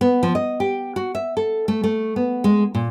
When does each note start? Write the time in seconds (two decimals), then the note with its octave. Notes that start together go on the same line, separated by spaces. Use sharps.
0.01 B3
0.23 F3
0.35 D#5
0.60 G4
0.96 F#4
1.15 E5
1.37 A4
1.68 A3
1.84 A3
2.16 B3
2.44 G#3
2.75 A#2